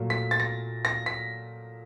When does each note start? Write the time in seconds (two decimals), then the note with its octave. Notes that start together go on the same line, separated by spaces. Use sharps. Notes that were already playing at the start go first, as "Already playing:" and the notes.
Already playing: A#2 F#3 A3
0.10 B6
0.31 A6
0.40 A#6
0.85 A#6
1.06 B6